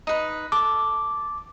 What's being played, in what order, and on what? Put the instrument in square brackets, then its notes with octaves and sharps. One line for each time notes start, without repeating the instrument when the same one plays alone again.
[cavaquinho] D#4 B4
[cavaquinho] A4 [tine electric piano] D6